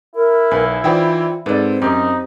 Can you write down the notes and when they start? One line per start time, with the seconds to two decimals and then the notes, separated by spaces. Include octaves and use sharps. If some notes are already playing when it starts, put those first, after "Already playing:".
0.15 E4 A#4
0.51 B1 B4 G#5
0.84 E3 D#4 F4 C5 D5 G5
1.46 G#2 C4 A4 B4 D5
1.82 F#2 D#4 G4 C5